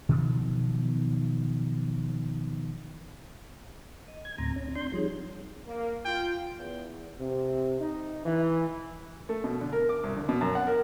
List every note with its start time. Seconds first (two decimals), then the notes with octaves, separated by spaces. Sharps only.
0.09 B2 D#3 F3 F#3
4.08 D#5
4.25 G#6
4.38 D2 A2 C4 A#5
4.56 C#4
4.75 D4 C6 G6
4.92 F3 G3 D#4 G#4 C#5
5.67 A#3
6.05 F4 G5
6.58 E2
7.19 C3
7.81 D#4
8.26 E3
9.29 A3
9.44 B2
9.61 D3
9.73 A#4
9.89 D6
10.04 C2
10.16 D3
10.29 B2
10.41 F#2
10.55 F#5
10.67 A#4